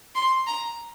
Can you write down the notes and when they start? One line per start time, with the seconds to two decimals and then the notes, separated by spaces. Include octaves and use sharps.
0.15 C6
0.47 A#5